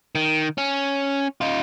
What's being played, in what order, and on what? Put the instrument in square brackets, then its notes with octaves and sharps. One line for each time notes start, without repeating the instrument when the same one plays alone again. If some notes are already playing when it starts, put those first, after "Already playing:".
[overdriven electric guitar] D#3
C#4
D#4 F4